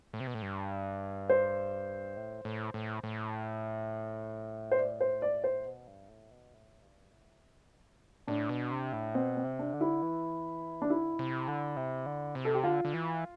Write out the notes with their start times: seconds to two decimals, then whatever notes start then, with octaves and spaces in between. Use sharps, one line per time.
0.14 A2
0.20 C3
0.27 B2
0.35 A2
0.42 G2
1.29 C5
2.17 A2
2.45 A2
2.74 A2
3.04 A2
4.72 C5
4.79 D5
5.01 C5
5.22 D5
5.44 C5
5.66 B2
5.88 G2
6.09 A2
6.31 B2
6.54 A2
6.82 G2
7.12 A2
7.40 C3
7.63 B2
7.84 A2
8.06 G2
8.27 A2 D4
8.49 B2
8.71 C3
8.93 A2
9.15 B2 C4
9.37 C4
9.44 C3
9.59 D4
9.74 D3
9.81 E4
10.02 E3
10.82 D4
10.89 D3 E4
11.14 B2
11.19 C3
11.48 D3
11.77 C3
12.06 D3
12.35 C3
12.45 A4
12.55 G4
12.64 D3 F4
12.85 D3
12.94 E3